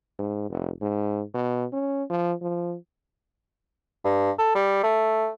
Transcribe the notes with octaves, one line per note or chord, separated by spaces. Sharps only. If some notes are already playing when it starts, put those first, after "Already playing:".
G#2
F1
G#2
B2
C#4
F3
F3
G2
A4
G3
A3